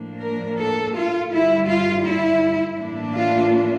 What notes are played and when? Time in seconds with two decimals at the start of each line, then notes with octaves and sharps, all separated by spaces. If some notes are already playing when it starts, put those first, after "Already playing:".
Already playing: A2 F3 A#3 D4
0.21 A#4
0.59 A4
0.95 F4
1.31 G2 D3 G3 E4
1.68 F4
2.05 E4
2.78 A2 E3 A#3 D4
3.15 F4